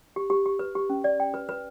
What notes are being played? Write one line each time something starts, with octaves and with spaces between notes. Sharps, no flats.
G4
G4
G4
B4
G4
C#4
D5
G5
B4
B4